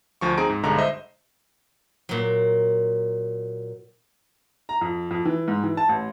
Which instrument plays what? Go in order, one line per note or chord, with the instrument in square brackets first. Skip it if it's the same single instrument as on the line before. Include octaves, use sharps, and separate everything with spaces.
[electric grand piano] D2 F3 C#6
C4 D#4 G#4 A#5 D7
G#2
B1 G2 D3 G#3 A#5
C5 D#5 E5
[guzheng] A#2 F#3
[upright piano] A#5
F2
F2
E3
G#2
E3
A5
A1